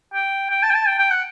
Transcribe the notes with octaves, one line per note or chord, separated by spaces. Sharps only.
G5
G5
A5
G5
A5
G5
G5
F#5